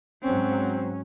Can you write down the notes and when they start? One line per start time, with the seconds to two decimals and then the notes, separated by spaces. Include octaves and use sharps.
0.22 G#2 F#3 C4 C#4